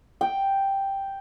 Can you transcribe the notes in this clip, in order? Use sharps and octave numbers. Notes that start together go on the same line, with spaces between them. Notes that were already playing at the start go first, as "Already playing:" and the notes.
G5